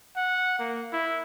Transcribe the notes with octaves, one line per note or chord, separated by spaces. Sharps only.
F#5
A#3
E4